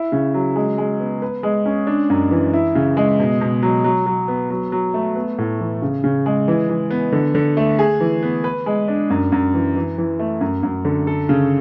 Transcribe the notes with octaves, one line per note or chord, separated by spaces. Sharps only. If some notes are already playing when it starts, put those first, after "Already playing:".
Already playing: E4
C#3
F#3
G#3
G#3
B3
B4
G#3
C#4
D4
F#2
E3
E4
C#3
G#3
B2
B2
F#3
F#3
F#3
B3
F#3
F#3
A3
B3
A2
E3
C#3
C#3
G#3
E3
E3
B3
D3
D3
A3
G#4
E3
B3
B4
G#3
D4
F#2
F#2
E3
E3
E3
A3
F#2
F#2
D3
A4
C#3